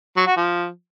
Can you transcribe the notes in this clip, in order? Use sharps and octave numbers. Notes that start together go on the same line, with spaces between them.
F#3
F#4
F3